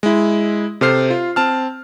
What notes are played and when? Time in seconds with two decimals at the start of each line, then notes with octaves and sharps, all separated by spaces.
0.03 G#3 E4
0.81 C3 A4 C5 F6 C7
1.10 F4
1.36 C4 A5 F6